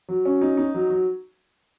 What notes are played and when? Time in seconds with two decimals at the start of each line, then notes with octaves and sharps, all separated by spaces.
0.09 F#3
0.25 C#4
0.41 D#4
0.57 D#4
0.74 F#3
0.90 F#3